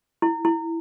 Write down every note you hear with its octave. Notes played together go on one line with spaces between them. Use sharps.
E4
E4